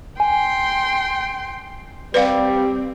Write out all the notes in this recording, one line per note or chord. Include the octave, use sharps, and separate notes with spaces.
G5 G#5 C6
G3 C4 B4 D5 F5